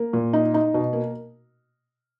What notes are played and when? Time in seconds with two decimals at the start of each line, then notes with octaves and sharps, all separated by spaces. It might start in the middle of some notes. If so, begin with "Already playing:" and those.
Already playing: A#3
0.13 A#2
0.33 D#4
0.54 D#4
0.74 B2
0.93 A#3